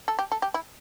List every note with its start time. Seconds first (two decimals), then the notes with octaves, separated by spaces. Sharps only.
0.08 A4
0.19 G4
0.32 A4
0.42 G4
0.54 E4